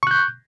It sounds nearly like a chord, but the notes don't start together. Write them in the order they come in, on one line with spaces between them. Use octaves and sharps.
C#6 F#6 G6